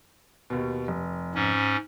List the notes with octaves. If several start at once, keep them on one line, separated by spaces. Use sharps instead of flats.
D#2 B2
F1
G#2 C#4